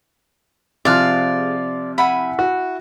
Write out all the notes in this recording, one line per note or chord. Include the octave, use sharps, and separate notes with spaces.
C3 F3 F4 G#4 D5 F5 F6 F#6
E4 F#5 G#5 B5
F#4